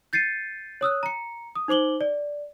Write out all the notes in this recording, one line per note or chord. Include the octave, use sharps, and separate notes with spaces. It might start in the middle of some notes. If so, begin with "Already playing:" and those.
G6 A6 C7 C#7 D#7
C#5 D#6 E6 F#6
A#5 C#7
D#6
D#4 C5 D6 F#7 G7
D5